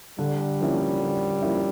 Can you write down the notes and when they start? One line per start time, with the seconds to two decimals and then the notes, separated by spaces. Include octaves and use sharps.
0.19 D3 G3
0.60 F3 A#3 C#4 E4
1.01 D3
1.42 F3 A#3 C#4 E4